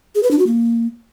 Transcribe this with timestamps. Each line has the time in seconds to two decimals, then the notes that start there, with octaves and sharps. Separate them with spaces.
0.15 G#4
0.23 B4
0.31 D4
0.39 F#4
0.47 A#3